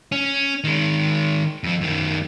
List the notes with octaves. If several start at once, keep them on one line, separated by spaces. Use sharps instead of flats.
C#4
D#3 G#3
F2 F3
F#2 D#3